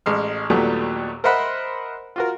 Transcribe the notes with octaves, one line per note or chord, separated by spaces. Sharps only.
A1 G#3 F6
D#2 A#2 F#3 G3 A3 B3
A#4 C5 D#5 E5 F#5 B5
F4 F#4 A#4